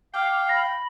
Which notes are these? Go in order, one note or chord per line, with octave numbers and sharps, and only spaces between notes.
F5 G5 D6
B5 A#6